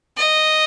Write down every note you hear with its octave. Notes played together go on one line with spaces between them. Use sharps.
D#5